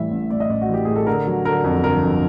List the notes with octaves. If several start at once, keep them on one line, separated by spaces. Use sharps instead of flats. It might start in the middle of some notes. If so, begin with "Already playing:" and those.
Already playing: A2 E3 G3 E5
A1
A2 D5
D#5
A1 D5
F#4
E3
G4
A2 G#4
A4
D3 A#4
F#3
D3 A#4
F2
G1 A#4
F2